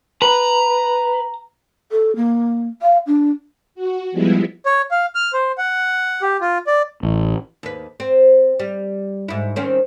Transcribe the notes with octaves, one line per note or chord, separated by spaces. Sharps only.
B4 A#5
A4
A#3
F5
D4
F#4
F3 G3 G#3 B3 E4
C#5
F5
F6
C5
F#5
G4
F4
D5
A1
D#2 B4
C4
G3
G#2 E4
D#3 C4 C#4